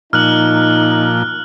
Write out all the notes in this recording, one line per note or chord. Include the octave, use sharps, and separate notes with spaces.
A#2 F3 D#4 F6 F#6 F#7